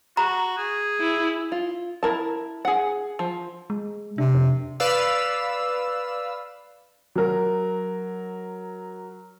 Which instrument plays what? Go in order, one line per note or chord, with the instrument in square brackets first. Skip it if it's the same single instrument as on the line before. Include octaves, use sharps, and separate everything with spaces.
[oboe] F#4 [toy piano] A#5
[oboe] G#4
[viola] E4
[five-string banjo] F4
E4 A#4 A5
G#4 F#5
F3
[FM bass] G#3
[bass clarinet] C3 [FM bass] D4
[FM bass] F2
[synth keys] B4 D5 F5 E6
[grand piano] F#3 A#4